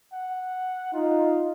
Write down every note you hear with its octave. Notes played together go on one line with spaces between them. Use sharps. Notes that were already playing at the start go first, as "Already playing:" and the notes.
F#5
D#4 F4